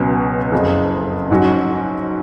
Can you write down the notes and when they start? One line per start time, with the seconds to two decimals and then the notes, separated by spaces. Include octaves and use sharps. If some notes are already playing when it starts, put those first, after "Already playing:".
Already playing: C#2 B2 F#3 C#4
0.52 F#1 F2 C#3
1.31 G#2 F#3 C#4 F#4